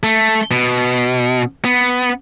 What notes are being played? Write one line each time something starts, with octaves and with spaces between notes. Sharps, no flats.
A3
B2
B3